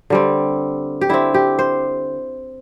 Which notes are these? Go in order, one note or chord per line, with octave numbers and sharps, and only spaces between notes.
D3 G3 C4
G4
D3 C4 E4
G4
C5